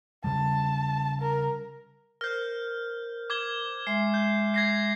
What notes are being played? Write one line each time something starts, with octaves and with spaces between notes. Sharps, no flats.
C#3 G3 A5
A#4
A#4 C5 F6 G6
D6 G#6 G7
G#3 E5 C6 C7
G6
G#6 A#6 C7